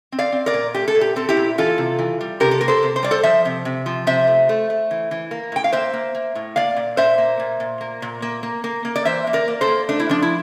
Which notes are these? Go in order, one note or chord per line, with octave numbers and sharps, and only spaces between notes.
C4
D5 F5
C4
A#4 D5
A#2
A3 G4
A4
A#2
G4
C4 A4
E4 G4
A#2
E3 F4 A4
C3
E3
G3
C3 G4 A#4
A4
A#3 A#4
A4 C5
C3
C5
G3 D5
A4 C5
F3 C5 E5
C3
C3
F3
C3 C5 E5
A3
A3
A3
E3
E3
A#3
A2 G5
F5
A#3 C5 E5
A#3
A#3
A2
A#3 D5 F5
A#2
A#2 C5 E5
A#3
A#2
A#2
A#3
A#2
A#3
A#3
A#3
A#3
D5
E3 C5 E5
A#3
A#4 D5
A#3
A4 C5
A#3
A3 D4
E4
F3 D4
E4